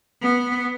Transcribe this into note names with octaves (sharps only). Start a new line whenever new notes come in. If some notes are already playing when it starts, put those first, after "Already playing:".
B3